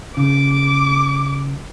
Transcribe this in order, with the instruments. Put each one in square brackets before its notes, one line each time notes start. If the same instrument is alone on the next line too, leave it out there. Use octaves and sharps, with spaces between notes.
[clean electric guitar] C#3 [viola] D6